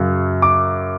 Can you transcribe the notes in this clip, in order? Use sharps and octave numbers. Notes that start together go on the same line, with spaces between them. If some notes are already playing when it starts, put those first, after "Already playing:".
Already playing: F#2 C#3 F#3
D6